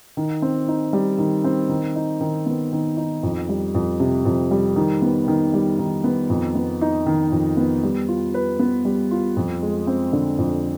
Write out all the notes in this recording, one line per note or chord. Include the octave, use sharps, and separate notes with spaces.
D#3
C4
D#4
G3
D#3
C4
D#3
D#4
D#3
B3
D#3
D#4
F2
G3
F2
C3
F2
G3
D#3
B3
D#3
G3
D#3
B3
F2
B3
D#4
D#3
F2
B3
G3
F4
B4
B3
G3
F4
F2
G#3
C4
D3
F2